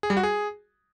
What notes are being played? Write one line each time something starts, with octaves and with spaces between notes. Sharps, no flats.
G#4
G3
F#4
G#4